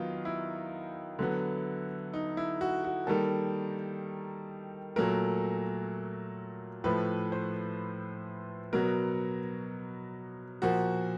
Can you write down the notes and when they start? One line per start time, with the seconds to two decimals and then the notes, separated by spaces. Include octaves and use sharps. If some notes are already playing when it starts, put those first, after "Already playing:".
Already playing: D#3 F#3 B3 D#4 F4
0.25 E4
1.19 D3 F#3 B3
2.13 D#4
2.37 E4
2.61 F#4
2.84 F#4
3.07 D#3 G3 A#3 A4
4.96 A#2 F#3 A3 A#4
6.84 A2 F3 A3 B4
7.32 C5
8.73 B2 F#3 B3 A#4
10.62 A#2 F3 A#3 F#4